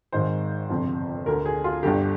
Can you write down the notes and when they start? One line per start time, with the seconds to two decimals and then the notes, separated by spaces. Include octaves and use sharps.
0.12 G#1 G#2 D#3 C5
0.70 G1 F2 C3
1.26 D2 D3 A#4
1.45 G#4
1.64 F4
1.83 G1 G2 D3 G4